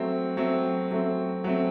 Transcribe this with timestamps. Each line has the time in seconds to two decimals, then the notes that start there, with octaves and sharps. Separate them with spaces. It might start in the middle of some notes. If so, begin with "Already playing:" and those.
Already playing: F#3 A3 C4
0.37 F#3 A3 C4
0.91 F#3 A3 C4
1.44 F#3 A3 C4